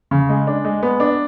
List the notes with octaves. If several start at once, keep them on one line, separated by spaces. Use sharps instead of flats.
C#3
G#3
D4
G#3
B3
D4